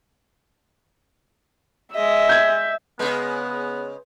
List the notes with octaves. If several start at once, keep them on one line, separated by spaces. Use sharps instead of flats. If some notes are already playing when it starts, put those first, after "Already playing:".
G#3 D#5 E5
G6 G#6
C#3 G#3 B3 B4 C6 G6